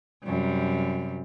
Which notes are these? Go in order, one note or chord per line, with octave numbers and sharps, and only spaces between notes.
F#2 C3 G3